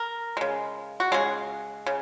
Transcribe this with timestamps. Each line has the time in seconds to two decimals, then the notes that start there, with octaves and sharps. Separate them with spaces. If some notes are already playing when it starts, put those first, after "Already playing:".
Already playing: A#4
0.37 C#3 G#3
1.00 F#4
1.12 C#3 G#3 G#4
1.86 C#3